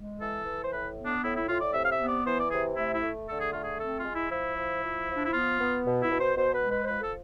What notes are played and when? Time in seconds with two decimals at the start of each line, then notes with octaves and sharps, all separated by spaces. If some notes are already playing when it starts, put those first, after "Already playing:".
Already playing: G#3
0.19 E3 A4
0.45 E3
0.63 C5
0.71 A2 B4
0.96 B3
1.05 D4
1.22 A2 E4
1.35 E4
1.48 A2 F4
1.61 D5
1.73 C3 E5
1.83 F5
1.91 E5
1.99 B3
2.08 D5
2.25 E3 C5
2.38 D5
2.50 C3 G#4
2.76 A3 E4
2.93 E4
3.02 A3
3.28 D3 A4
3.40 G#4
3.50 A3 F4
3.62 G#4
3.79 C4 A4
3.96 F4
4.05 G#3
4.13 E4
4.31 F3 E4
4.57 F3
4.82 F3
5.08 F3
5.15 D4
5.25 E4
5.33 B3 F4
5.59 B3
5.85 B2
6.02 E4
6.11 B2
6.19 C5
6.36 B2 C5
6.53 B4
6.62 G#3
6.70 B4
6.83 C5
6.87 F3 B4
7.01 A4